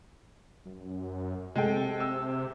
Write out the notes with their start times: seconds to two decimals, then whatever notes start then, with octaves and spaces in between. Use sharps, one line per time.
0.66 F#2
1.56 C3 G#3 A4 G5
2.00 E6